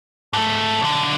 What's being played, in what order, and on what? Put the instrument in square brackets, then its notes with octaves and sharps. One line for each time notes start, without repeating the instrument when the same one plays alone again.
[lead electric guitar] G#2 A3 [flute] A5
[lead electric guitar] B1 D3